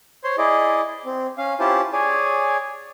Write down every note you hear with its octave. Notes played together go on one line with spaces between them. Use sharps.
C5 C#5 C6
E4 G#4 D5 D#5
C4
C#4 F5
C#4 E4 F4 G4 C5 A5
G#4 C#5 D5 G#5